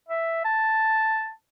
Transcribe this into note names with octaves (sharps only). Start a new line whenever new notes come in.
E5
A5